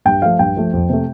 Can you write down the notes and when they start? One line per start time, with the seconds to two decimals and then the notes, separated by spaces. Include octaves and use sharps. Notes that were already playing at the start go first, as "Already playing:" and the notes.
0.05 G2 G5
0.22 F3 A3 F5
0.39 G2 G5
0.56 F3 A3
0.73 F2
0.89 C3 A3